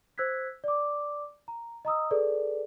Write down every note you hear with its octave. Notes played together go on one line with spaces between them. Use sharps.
C5 E6 F#6 G#6 B6
D5 D6
A#5
D#5 A#5 D#6 E6
G#4 A4 B4 D5